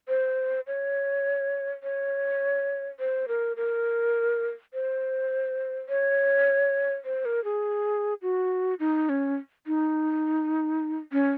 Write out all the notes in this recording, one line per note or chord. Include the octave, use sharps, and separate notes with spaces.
C5
C#5
C#5
C5
A#4
A#4
C5
C#5
C5
A#4
G#4
F#4
D#4
C#4
D#4
C#4